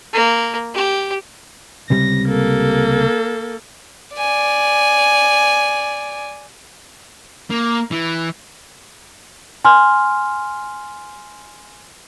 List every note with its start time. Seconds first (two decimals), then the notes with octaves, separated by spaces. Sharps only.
0.14 A#3
0.75 G4
1.90 C#2 C3 G3 A#6
2.28 A#3 A4
4.16 D5 G#5
7.50 A#3
7.91 E3
9.65 G#5 C6 F6